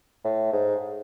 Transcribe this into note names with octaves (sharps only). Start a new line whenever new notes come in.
A2
G#2